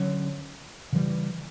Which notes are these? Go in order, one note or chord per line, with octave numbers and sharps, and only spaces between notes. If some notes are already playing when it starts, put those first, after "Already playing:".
Already playing: D3 F#3 C#4
C#3 E3 G3